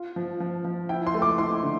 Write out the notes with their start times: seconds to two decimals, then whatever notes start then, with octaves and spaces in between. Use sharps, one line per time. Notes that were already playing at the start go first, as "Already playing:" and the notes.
Already playing: F4
0.16 F3
0.40 F3
0.65 F3
0.89 E4 G5
1.07 C6
1.14 A3
1.22 D6
1.38 E4 C6
1.63 D3